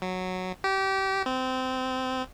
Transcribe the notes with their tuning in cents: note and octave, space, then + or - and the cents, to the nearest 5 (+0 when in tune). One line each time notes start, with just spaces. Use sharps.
F#3 -5
G4 -25
C4 -20